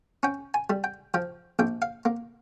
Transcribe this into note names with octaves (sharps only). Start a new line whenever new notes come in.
C#4 G5
G#5
G3
G5
F3 G5
A#1 G5
F5
A#3